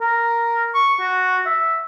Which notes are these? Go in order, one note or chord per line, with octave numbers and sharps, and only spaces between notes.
A#4
C#6
F#4
E5